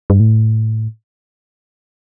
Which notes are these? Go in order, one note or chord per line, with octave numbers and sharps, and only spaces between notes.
G2
A2